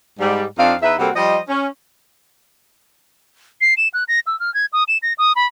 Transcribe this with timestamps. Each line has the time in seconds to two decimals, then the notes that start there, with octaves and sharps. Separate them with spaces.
0.20 G#2 G3
0.58 F2 C4 D4 D#4 F5
0.82 E2 D#4 E4 B4 E5
0.99 C3 G3 A#3 C4 F#4 A4
1.16 F3 G3 C5 D#5
1.48 C#4
3.61 C7
3.77 E7
3.94 F#6
4.08 A#6
4.27 E6
4.40 F6
4.54 G#6
4.73 D#6
4.88 E7
5.02 A#6
5.18 D#6
5.36 B5